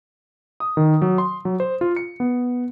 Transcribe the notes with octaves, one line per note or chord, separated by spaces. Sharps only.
D#6
D#3
F#3
C6
F#3
C5
F4
C#7
B3